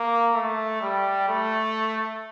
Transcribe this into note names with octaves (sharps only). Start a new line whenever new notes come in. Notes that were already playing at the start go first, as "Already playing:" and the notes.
Already playing: A#3
A3
G3
A3